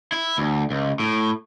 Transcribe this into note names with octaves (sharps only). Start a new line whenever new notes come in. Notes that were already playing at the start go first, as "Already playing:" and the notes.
E4
D2
C#2
A2